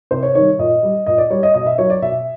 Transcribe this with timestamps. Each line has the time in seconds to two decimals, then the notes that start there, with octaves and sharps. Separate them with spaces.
0.11 C3 C5
0.23 C#5
0.35 D#3 G3 C#5
0.59 A#2 D#5
0.83 G3
1.06 A#2 D#5
1.18 D5
1.30 G3 C#5
1.43 D#5
1.54 B2 D#5
1.66 E5
1.78 F#3 C#5
1.90 D5
2.02 B2 E5